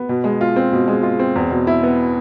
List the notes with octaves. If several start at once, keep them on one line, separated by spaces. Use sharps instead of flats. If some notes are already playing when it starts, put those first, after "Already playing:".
Already playing: B3
B2
G#3
F4
C4
B2
G#3
F4
C4
E2
B2
E4
B3